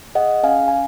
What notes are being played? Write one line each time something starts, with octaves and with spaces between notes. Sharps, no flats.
G#4 D#5 F#5
C#4 F5 G#5
G#5